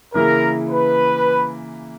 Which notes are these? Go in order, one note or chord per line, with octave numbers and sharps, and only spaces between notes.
C#3 E3 A#3 E4 A#4
B4